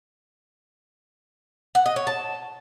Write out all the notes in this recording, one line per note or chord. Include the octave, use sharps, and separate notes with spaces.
F#5
D#5
C#5
A5